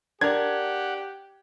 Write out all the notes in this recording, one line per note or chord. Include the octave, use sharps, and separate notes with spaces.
D4 G4 A#4 F#5 G#6